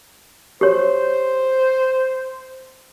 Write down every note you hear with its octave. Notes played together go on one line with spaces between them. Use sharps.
G4 C5 C#5